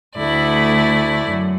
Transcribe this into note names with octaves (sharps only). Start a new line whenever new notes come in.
D2 D3 A3 E4 D5
F#2